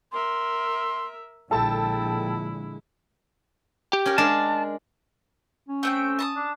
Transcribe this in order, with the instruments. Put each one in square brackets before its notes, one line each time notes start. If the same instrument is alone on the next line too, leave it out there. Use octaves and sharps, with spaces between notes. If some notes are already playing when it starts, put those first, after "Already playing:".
[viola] A#4 E5 [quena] C6
[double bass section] A#1 D3 G#3 [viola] E4 [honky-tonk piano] A4 A5 [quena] G5
[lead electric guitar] G4
[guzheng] C#4 A#4
[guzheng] G#3 D4 A#4 [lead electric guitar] A5
[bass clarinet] C#4
[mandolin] A3 C4 G5 [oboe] E6
[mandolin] A5 A#5 D#6
[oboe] D4